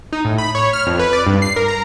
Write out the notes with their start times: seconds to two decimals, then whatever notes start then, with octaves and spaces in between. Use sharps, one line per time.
0.13 D#4
0.25 A2
0.38 B5
0.55 C#5
0.73 F6
0.87 F2
0.99 B4
1.13 D5
1.27 G2
1.42 C7
1.56 A#4
1.68 A#5